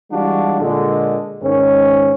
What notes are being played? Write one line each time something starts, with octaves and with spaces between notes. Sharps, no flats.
E3 G3 G#3 D4 F4 F#4
A#2 D3 G#3
G#2 D#3 C#4